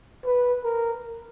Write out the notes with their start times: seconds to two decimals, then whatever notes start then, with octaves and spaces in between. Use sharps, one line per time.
0.25 B4
0.64 A#4